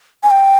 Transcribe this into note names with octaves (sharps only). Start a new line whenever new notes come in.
G#5
G5